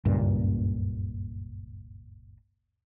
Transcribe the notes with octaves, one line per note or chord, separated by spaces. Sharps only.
F#1 C#2 G2 A#2